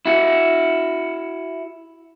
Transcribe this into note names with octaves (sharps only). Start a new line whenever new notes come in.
E4 F#4